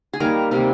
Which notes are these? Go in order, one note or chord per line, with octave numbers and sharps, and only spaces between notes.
G#4
D#3 G3 A#3 A#4
C3 G3 A#3 A#4